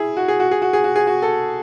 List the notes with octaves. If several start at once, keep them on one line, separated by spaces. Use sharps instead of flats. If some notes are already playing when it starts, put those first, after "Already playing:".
Already playing: E4 G#4
F#4
G#4
F#4
G#4
F#4
G#4
F#4
G#4
F#4
A4